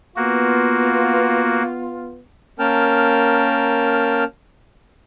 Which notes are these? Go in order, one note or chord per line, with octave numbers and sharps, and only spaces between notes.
A#3 B3 F4 F#4
A#3 C#4 A#4 G5 A5 F6